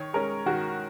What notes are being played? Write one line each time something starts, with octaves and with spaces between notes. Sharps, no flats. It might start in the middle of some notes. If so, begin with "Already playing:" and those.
Already playing: D#3 C#5
G#3 C#4 A#4
D#3 F#4